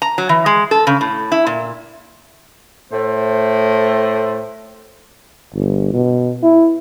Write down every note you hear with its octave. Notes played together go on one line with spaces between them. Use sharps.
A#5
F#3
E3
G#3
A4
C#3
A2
E4
A#2
A2 A3 C5
G1
B2
E4